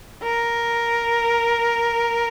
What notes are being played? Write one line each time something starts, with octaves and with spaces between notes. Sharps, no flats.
A#4